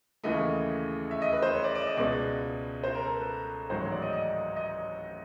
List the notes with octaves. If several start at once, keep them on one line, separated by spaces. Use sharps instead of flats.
D#2 C#3 E3 A3 D#5
E5
D#5
B4
C5
C#5
D5
D5
D#5
C#2 B2 G#3 B3 D5
C5
A#4
A4
B4
A1 G#2 D#3 F#3 C5
C#5
D5
D#5
D#5
D#5